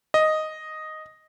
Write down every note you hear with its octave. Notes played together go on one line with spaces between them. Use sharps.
D#5